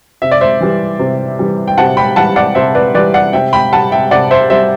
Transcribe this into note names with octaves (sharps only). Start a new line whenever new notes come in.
C3 E5
D5
C5 E5
E3 G3
C3
E3 G3
G5
C3 F#5 A5
G5 B5
E3 G3 F#5 A5
D5 F#5
C3 C5 E5
B4 D5
E3 G3 B4 D5
D5 F#5
C3 E5 G5
G5 B5
G3 F#5 A5
E5 G5
C3 D5 F#5
C5 E5
G3 C5 E5